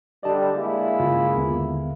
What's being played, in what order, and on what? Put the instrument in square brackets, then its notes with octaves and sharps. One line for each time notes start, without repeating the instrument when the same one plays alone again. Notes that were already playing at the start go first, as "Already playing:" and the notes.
[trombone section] D3 G3 [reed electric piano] D5 D#5 A5
[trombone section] G#3 A#3 E4
[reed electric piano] G2 C#3 F4
D#2 D3 B3